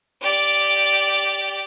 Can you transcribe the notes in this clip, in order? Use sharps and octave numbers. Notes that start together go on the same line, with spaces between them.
G4 D5